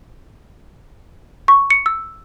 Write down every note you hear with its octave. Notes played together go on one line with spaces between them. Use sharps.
C#6
C#7
E6